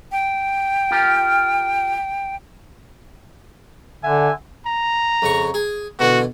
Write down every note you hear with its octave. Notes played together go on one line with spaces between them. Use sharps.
G5
F4 G4 A#4
D3 E5 F#5 G#5
A#5
F2 C#3 C#6
G#4
B2 D3 E3 F#4